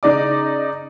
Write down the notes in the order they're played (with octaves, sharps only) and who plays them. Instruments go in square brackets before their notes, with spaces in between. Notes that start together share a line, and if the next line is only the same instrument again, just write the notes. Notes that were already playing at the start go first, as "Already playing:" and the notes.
[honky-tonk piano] C#3 D#4 D5 D6